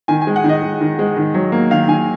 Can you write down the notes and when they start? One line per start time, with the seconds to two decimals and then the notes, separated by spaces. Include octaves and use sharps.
0.08 D#3 G#5
0.22 G#5
0.27 G#3
0.36 F#5
0.44 D#3 D#5
0.62 G#3
0.81 D#3
0.99 G#3
1.16 D#3
1.34 F#3
1.52 A#3
1.71 D#3 F5
1.88 D#3 G#5